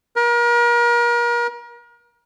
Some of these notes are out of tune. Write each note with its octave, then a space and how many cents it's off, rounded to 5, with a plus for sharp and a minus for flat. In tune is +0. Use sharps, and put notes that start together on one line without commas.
A#4 +35